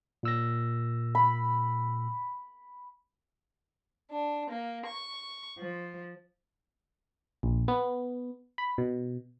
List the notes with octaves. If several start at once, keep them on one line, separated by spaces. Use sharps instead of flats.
A#2 E6 A#6
B5
D4
A#3
C#6
F3
A#1
B3
B5
B2